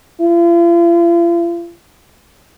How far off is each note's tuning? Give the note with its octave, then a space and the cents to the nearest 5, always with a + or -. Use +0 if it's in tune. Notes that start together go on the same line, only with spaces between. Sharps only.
F4 -40